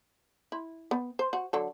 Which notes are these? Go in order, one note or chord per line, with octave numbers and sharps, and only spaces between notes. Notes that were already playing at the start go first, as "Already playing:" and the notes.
E4
B3
C5
F#4
D3 F#3 A4